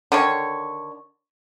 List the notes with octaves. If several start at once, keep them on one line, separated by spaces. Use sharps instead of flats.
D3 D#3 C#5